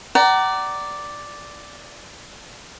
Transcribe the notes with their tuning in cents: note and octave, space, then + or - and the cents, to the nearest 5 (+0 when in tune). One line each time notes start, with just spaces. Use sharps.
D5 +0 F#5 +40 A#5 +0